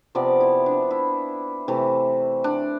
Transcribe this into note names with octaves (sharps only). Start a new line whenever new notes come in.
C3 F3 B3 D5
E4
D4
E4
C3 E3 A3
D4